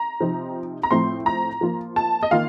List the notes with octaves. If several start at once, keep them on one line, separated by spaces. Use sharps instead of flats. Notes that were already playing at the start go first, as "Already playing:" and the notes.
Already playing: A#5
C3 F3 C4 D#4
A#5
A2 F3 A3 C4 C6
A#5
F3 A#3 F4
A5
D#5
D#3 A#3 F4 F5